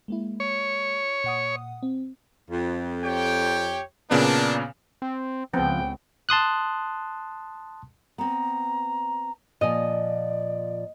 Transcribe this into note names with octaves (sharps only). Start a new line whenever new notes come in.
G#3 A#3 E4
C#5
A#2 F#5 D#6
C4
F2
G4 C#5 G5
A#2 C#3 A#3 B3 D4
C4
C#2 C#3 F3 B3 C4 G5
A5 C6 D#6 F#6
B3 C4 A#5
A#2 F3 D5 D#5 G#5